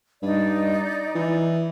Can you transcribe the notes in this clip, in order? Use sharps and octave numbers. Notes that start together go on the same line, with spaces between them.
G2 D#4 D5
E3